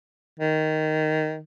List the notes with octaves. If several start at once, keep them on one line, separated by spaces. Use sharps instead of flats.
D#3